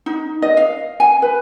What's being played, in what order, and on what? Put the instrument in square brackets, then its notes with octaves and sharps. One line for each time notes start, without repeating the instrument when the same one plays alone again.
[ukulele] D#4
D#5
F5
G#5
B4